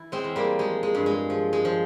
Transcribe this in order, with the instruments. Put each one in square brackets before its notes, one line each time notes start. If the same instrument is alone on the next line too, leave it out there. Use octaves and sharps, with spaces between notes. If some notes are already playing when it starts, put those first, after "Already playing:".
Already playing: [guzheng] E3 E4
G#3 C4
E2
G3 A#3
F3 G#3
G#3
G2
G#3
F3
G#3
F3